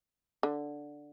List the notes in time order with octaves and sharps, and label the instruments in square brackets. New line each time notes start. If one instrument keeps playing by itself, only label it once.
[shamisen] D3